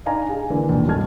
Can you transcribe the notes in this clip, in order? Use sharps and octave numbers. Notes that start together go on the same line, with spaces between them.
D4 D#4 D5 F5 G#5 A#5
G#4 G#5
D3 E3 A#3 D4
D#2 A#2
B1 G2 G#5 A5 F6 G#6